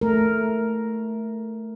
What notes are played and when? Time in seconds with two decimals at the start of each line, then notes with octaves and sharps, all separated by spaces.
0.01 A3 A#4